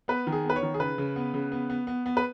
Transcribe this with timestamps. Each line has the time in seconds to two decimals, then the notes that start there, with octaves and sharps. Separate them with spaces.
0.08 B3 B4
0.27 D#3
0.32 G#4
0.44 B3
0.50 B4
0.56 C#5
0.63 D#3
0.74 G#4
0.80 C#3 B4
0.98 C#3
1.16 B3
1.34 C#3
1.52 B3
1.70 B3
1.87 B3
2.06 B3
2.17 B4